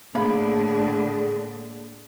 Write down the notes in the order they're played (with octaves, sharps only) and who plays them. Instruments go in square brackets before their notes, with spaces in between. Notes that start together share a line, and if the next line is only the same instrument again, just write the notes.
[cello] A2 D3 [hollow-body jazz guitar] A#3 B5 [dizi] G#4